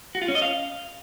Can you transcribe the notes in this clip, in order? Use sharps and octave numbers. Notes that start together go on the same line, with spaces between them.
F#4
F4
C#4
D#5
F5